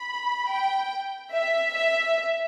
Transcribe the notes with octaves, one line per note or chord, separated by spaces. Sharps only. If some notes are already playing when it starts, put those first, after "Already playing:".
Already playing: B5
G5
E5
E5